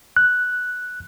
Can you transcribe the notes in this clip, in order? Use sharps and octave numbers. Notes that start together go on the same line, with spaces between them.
F#6